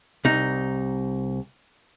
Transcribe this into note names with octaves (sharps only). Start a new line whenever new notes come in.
C2 D#4